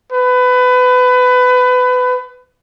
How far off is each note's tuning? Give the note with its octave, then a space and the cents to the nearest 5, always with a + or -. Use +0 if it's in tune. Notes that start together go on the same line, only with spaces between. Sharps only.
B4 +25